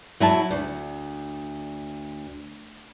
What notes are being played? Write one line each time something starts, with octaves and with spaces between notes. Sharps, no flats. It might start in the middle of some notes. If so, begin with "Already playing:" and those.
F#3 E4 E5 A5
D2